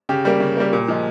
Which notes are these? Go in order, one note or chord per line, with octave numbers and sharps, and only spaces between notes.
C#3 G4
G3 A#3
C#3
G3 A#3
A#2
F3 G#3